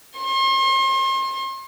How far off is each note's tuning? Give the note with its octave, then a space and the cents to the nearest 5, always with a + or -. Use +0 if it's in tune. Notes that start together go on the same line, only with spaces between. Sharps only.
C6 +40